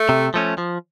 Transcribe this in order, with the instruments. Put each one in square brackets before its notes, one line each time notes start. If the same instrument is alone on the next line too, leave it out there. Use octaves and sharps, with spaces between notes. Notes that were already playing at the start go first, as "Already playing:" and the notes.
Already playing: [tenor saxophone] A3
[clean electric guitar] C3
F3 A3 C#4
F3